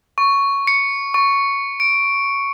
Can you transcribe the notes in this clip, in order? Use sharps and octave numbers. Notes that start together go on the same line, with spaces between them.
C#6
C#7
C#6
D7